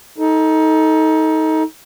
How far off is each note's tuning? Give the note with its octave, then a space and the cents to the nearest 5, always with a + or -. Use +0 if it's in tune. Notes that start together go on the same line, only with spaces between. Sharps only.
D#4 +25 A4 +0